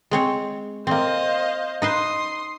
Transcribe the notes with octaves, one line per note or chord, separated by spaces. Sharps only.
G#3 C4 C#5
A#3 C4 C5 D#5 F5
D#4 B4 C5 C6 D#6